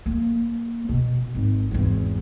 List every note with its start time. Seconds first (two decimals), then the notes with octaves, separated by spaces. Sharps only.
0.06 A#3
0.89 B2
1.35 G#1
1.71 G#1 E2